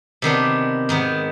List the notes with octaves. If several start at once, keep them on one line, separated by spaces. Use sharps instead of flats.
C3 D#3 B3 D4
G#2 D#3 B3